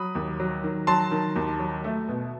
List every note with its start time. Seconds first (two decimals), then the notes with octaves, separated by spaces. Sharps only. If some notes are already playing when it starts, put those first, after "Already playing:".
Already playing: F#3 B5 D#6
0.15 D#2
0.40 F#3
0.63 D#3
0.87 F#3 A5 C6
1.11 D#3
1.36 D#2
1.59 F#3
1.84 A3
2.08 B2